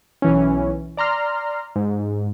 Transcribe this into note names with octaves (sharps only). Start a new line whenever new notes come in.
B1 E3 C#4
D5 A#5 C6 F6
G#2